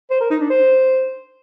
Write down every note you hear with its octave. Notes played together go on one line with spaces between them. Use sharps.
C5
A#4
D#4
D4
C5